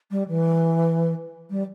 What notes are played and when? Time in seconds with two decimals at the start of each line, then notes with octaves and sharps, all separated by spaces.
0.11 G3
0.28 E3
1.50 G3